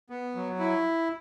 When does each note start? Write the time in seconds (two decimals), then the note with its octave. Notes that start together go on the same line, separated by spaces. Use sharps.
0.10 B3
0.35 F#3
0.59 E4